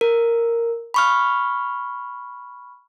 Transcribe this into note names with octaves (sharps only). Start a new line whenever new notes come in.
A#4
B5 C#6 F6